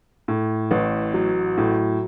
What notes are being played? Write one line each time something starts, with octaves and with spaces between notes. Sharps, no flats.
A2
A1
F#3
A2